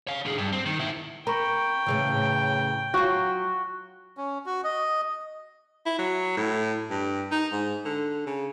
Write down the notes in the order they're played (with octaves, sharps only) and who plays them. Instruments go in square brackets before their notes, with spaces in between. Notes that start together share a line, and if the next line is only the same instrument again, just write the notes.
[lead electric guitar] C#5 F5
D3 G#4
G2
C4
D#3
D#3 E4
[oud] A#4 [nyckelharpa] G5 [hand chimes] A#5 B5 C#6
[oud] A2 C#3 E3
[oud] F#3 F4 [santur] F#4
[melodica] C#4
F#4
D#5
[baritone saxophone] E4
F#3
A2
G2
D#4
G#2
D3
C#3